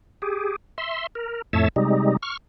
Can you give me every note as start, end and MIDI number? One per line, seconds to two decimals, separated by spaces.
0.22 0.56 67
0.22 0.56 68
0.78 1.07 76
0.78 1.07 84
1.15 1.42 70
1.53 1.68 41
1.53 1.68 45
1.53 1.68 57
1.53 1.68 73
1.53 1.68 76
1.53 1.68 81
1.76 2.17 48
1.76 2.17 55
1.76 2.17 56
1.76 2.17 63
2.22 2.37 85
2.22 2.37 89